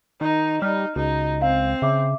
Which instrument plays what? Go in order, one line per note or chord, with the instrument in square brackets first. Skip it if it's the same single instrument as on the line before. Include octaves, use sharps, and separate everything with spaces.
[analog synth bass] D#3 [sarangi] D#4
[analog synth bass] G3 [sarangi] D#4 [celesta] F6
[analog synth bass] C#2 [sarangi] D#4 [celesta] F#4
[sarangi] C4 [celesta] F5
[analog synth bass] C#3 [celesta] E5 D6